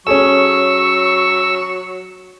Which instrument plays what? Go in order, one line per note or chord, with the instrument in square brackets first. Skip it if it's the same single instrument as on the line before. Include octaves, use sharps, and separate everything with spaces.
[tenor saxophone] F#3 [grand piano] C#4 G#4 A4 [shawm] C#6 [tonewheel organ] E6